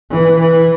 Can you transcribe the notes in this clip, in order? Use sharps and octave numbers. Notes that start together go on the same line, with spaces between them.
E3
E3